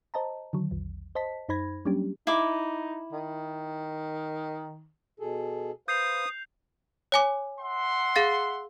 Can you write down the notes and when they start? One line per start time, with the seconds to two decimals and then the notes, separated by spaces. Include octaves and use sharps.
0.14 C5 D#5 A5 A#5
0.53 D3 D#3 F#3
0.71 A#1 E2
1.15 C5 D#5 A5 B6
1.49 F#2 D#4 C5 B5 G#6 A#6
1.85 F#3 G3 A#3 C#4 D4 G4
2.27 D#4 E4 D6
3.12 D#3
5.20 B2 G#4 A4
5.88 B4 C5 F5 D#6 G6 C7 F7
7.12 C#5 G#5 D6
7.60 E5 F#5 C6
8.16 G#4 F5 A6